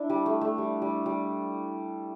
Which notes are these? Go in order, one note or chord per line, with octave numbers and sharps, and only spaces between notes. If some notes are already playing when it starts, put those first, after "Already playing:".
Already playing: D4 E4
G3
A3
A3
G3
G3
G3